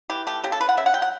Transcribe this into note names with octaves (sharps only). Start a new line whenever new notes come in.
E3 G4
A3 G4
C#3 G4
A4
E3 B4
F#5
C#3 E5
F#5
F#3 G5
F#5